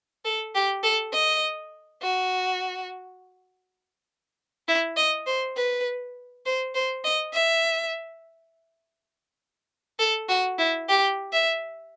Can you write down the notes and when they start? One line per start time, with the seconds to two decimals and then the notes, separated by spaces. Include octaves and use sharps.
0.25 A4
0.55 G4
0.83 A4
1.14 D#5
2.02 F#4
4.68 E4
4.97 D#5
5.27 C5
5.57 B4
6.46 C5
6.75 C5
7.04 D#5
7.33 E5
10.00 A4
10.29 F#4
10.58 E4
10.89 G4
11.33 E5